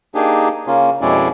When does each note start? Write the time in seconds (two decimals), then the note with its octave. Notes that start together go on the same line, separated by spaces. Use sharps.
0.15 A#3 D4 D#4 G4 G#4
0.67 C#3 A#3 C#4 F4
1.01 F2 B2 G#3 C#4 E4 D5